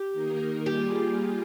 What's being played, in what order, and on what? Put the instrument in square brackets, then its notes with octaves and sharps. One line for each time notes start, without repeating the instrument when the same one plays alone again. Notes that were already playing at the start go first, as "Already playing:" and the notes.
Already playing: [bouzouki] G4
[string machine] D#3 A#3 D#4 A#4
[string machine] G3 A#3 F4 G#4 [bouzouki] G4